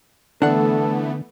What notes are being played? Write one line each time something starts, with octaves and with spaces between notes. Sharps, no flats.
D3 E3 A3 B3 D4 A4 F#5